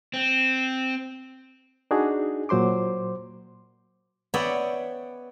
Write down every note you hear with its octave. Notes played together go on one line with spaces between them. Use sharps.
C4
D4 D#4 F#4 G#4
A#2 F#3 C5 C6 D6
B3 C#5 D5 E5 F#5 G5